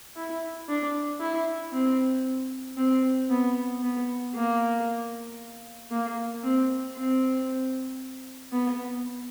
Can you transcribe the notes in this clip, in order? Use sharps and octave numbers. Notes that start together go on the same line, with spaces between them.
E4
D4
E4
C4
C4
B3
B3
A#3
A#3
C4
C4
B3